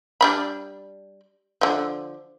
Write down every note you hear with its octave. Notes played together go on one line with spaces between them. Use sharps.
G3 D4 B5
D3 F3